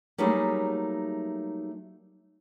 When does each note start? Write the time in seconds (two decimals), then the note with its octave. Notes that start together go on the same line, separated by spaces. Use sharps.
0.18 F#3 G3 A3 A#3 D#4 G#4